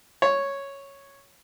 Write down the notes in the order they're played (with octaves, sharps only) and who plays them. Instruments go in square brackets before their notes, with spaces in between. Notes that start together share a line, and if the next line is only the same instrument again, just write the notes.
[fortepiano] C#5